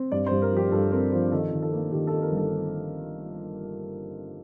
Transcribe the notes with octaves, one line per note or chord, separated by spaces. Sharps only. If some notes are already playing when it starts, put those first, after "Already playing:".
Already playing: C4
G2 D5
G2 C5
A#4
F3 G4
G2 A4
C4 A#4
F3 C5
D#3 A4
D#3
A4
A#3
D#3 G4
D#3 A4
A#4
G1
A4